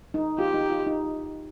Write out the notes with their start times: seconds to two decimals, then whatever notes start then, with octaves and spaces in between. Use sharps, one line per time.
0.14 D#4
0.38 F4 G4
0.54 D#4
0.70 F4
0.86 D#4